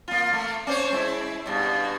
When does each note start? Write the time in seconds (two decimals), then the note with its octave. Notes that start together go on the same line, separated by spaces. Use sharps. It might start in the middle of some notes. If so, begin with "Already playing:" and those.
0.08 A#3 F4
0.33 A3
0.67 C#4 C5 C#5
0.92 G#3 E4
1.46 G2 B2